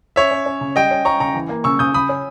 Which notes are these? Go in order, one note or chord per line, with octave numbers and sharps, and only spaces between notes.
C#4 C#5 E5
C#4
C#4
C#3
G3 D#5 G5
C#4
C#4 A#5 C#6
C#3 A#5 C#6
E3
A#3
C#3 C#6 E6
C#3 D#6 G6
C#3 B5 D#6
C#4